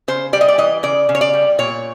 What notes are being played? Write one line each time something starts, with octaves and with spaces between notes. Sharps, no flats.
C#3 C5
G3 D5
D#5
D5
E3 D#5
C#3 D5
C#3
C#5
D5
G3
A#2 C#5